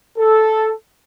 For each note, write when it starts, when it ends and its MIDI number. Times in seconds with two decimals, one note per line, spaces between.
0.18 0.72 69